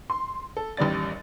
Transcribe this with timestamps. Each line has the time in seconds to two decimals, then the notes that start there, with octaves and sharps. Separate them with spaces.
0.10 C6
0.57 A4
0.77 A1 D#2 G3 D5 A6